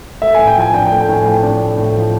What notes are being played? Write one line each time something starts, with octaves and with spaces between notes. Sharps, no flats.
A3 E5
A2 G#5
G5
F3 G#5
D4 G5
G5
A3
G5
A2 G#5
F3 G5
D4
A3
A2
F3